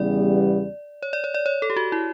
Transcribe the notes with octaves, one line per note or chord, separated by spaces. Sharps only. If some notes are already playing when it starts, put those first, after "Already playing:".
Already playing: E2 C#3 G3 B3 D5
C#5
D5
C#5
D5
C#5
A4
G4
F#4
E4